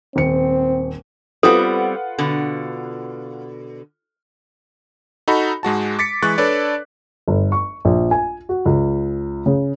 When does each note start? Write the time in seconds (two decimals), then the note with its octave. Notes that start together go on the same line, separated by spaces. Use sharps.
0.16 D#1 C4 C#7
1.43 G3 B3 C4 F4 A4 B4 F#5
2.18 B2 D3
5.28 D#4 F#4 A4 B5
5.63 G#2 G#3 F#4 A5
5.99 D6 A6 B6 C#7
6.23 E3 G#3 C#6 F#6 A6
6.38 D4 A4 B4 C#5 D5
7.28 G1
7.52 C#6
7.85 A#1
8.11 G#5
8.49 F#4
8.66 C#2
9.46 C#3